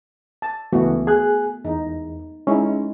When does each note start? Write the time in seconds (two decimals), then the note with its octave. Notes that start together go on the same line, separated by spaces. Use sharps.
0.42 A5
0.73 C#2 E3 A3 B3 F#4
1.07 G#4 G#5 F#6
1.65 E2 D#4
2.47 G#3 C#4 D#4 E4